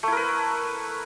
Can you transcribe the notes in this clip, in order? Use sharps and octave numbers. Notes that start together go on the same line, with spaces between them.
A3 E4 A#4 B4